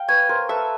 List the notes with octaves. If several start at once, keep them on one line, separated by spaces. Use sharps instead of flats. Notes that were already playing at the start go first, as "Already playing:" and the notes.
Already playing: F5 G5
B4 C#5 G#5
A#4 C5
A4 B4 E5